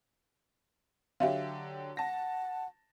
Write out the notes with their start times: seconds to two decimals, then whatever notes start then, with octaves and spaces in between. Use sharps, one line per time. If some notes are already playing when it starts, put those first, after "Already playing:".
1.20 D3 F#3 G4 E5 F5
1.97 F#5 A5 A#6